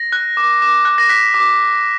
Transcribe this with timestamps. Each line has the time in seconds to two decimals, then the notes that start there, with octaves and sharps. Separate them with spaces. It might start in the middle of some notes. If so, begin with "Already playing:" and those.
Already playing: A#6
0.12 F#6
0.37 D6
0.62 D6
0.85 F#6
0.98 A#6
1.09 F#6 B6
1.34 D6